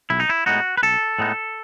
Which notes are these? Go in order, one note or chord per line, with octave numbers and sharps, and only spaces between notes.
B1 E4
D#4
E4
A2 G#3 B3 D#4 F#4
B4
B1 A4
A2 G#3 B3 D#4